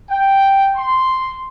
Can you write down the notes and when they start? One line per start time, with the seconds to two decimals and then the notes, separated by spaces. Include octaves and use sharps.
0.10 G5
0.76 C6